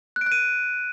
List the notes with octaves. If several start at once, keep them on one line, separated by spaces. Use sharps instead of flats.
F#6
D7
F#6
D#7